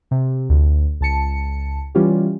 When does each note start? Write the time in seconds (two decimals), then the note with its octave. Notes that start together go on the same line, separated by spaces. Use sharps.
0.11 C3
0.49 D2
1.01 C#2 A5 C#7
1.95 E3 G3 C#4 F4 G4